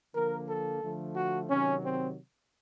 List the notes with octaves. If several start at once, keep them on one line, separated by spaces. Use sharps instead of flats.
D3 F3 A#3 A#4
A4
D3 F3 A3
F#4
C3 D#3 F#3 C#4
C4